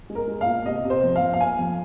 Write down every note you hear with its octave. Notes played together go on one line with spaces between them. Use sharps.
G#3
A#4
G#3
F5
A#2
C3 D#5
C3
C5
F2
F5
F2
F5
A#3 G#5
F2